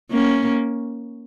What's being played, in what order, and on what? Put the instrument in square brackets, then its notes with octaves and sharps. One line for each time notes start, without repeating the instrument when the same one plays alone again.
[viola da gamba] A#3 C#4